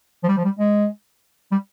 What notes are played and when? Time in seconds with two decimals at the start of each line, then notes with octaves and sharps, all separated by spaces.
0.23 F3
0.28 G3
0.37 F3
0.44 G3
0.59 G#3
1.51 G3